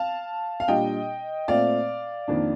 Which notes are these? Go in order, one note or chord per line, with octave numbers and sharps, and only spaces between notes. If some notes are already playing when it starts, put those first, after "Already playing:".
Already playing: F5 A5
F5
A#2 G3 D4 D#5 G5
A#2 A3 C4 D5 F5
F2 D#3 A#3 D4